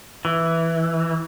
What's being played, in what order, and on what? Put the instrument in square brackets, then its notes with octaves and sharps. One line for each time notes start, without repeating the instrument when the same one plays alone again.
[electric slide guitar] E3